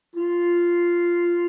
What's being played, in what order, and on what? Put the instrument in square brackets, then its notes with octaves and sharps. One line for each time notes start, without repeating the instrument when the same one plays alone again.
[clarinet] F4